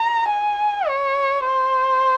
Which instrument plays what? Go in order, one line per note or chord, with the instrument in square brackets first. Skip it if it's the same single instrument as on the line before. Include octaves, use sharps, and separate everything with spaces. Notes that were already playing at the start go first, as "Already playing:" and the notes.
Already playing: [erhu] A#5
G#5
C#5
C5